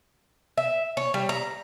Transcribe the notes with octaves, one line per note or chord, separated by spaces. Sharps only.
E5
C#5
G3
A#5